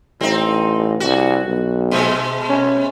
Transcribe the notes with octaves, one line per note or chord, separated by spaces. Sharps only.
A1 C4 D#4
C2 F#4
B1
B2 G#3 A3
C#4